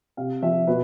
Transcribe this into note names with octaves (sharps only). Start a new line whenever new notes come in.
C3 F5
F3 E5
B2 B4